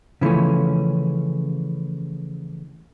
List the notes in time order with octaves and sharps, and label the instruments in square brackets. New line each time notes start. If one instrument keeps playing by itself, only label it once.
[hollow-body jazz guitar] C#3 E3 F3 A3 C#4